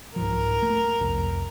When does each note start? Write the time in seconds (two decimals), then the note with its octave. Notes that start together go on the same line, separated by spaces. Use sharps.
0.16 C2 G#2 F3 A#4
0.63 A3
1.01 C2 F2